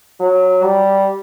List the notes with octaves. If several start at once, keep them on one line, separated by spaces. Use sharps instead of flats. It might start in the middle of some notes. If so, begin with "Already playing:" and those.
F#3
G3